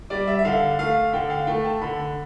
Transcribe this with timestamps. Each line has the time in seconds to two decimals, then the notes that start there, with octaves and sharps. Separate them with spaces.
0.10 G3 D5
0.27 E5
0.39 E5
0.45 D3 F5
0.79 A3 F5
1.13 D3 G5
1.30 F5
1.47 A3 G5
1.64 A5
1.81 D3 B5